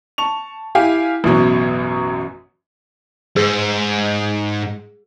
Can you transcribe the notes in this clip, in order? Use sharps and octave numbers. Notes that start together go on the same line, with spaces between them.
A5 C#6 F7
E4 G4 F5 G#5
A1 F#2 B2 F#3
G#2 G#4